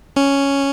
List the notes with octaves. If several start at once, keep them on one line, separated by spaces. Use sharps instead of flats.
C#4